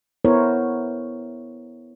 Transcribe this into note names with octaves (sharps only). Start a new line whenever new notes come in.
B3 E4 A#4 C5 C#5